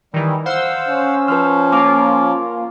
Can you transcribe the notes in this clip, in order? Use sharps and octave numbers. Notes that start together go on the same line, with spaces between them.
D#3 E3 G3
C5 F5 F#5 E6
C#4
F3 B4 C6 F6
A#3 F4 D6